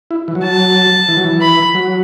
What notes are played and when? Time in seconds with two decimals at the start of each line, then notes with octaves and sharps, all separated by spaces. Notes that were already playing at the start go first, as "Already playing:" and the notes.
0.11 E4
0.28 E3
0.35 F#3
0.44 A5
1.08 E3
1.17 F#3
1.24 E3
1.41 B5
1.75 F#3